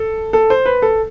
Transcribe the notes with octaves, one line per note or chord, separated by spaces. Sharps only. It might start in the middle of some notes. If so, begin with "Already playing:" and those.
Already playing: A4
A4
C5
B4
A4